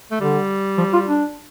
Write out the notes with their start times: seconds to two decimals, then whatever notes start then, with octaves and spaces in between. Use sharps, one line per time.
0.11 A3
0.20 D3 G3
0.78 F3
0.93 F4
1.07 D4